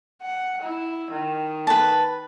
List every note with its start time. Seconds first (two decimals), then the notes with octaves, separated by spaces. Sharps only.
0.23 F#5
0.62 E4
1.11 D#3
1.67 B4 A5